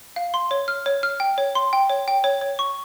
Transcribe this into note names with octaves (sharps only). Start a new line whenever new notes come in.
F5
C6
C#5
F6
C#5
F6
G5
C#5
C6
G5
C#5
G5
C#5
C#5
C#6